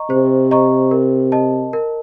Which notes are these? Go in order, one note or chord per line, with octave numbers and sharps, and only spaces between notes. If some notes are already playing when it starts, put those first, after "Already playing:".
Already playing: D#5 A#5 C#6
C3 C5
D#5 A#5 C#6
A#4
D#5 A5
A#4